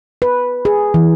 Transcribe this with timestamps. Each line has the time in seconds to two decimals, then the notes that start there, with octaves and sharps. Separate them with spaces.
0.22 B4
0.65 G#4
0.94 E3